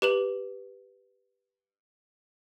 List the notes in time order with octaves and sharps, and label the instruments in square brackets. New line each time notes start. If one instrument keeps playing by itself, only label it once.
[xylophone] G4 B4 E7 F#7